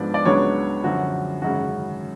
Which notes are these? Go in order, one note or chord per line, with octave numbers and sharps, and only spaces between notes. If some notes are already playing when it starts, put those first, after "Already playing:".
Already playing: G#2 F3 B3 D4 D5
D5
C#2 C#3 F#3 B3 D4 C#5
F#2 D3 F3 F#4
G#1 F#2 C#3 F#4